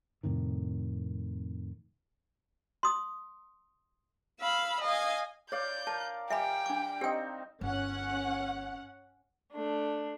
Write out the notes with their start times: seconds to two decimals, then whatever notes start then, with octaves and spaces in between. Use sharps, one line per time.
0.23 F2 A2 C3 D#3
2.83 C6 D#6
4.39 F5 B5 E6
4.82 D#5 F5 G#5
5.52 C#5 D5 F5 G6
5.87 A#4 A5
6.30 G3 E5 G5 G#5 B5
6.66 D4 D6
7.01 C4 D#4 G4 G5
7.61 G1 C#4 F#5
9.53 A3 D4